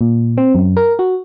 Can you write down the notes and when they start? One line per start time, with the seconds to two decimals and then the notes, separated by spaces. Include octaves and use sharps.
0.01 A#2
0.38 C4
0.55 F#2
0.77 A#4
0.99 F#4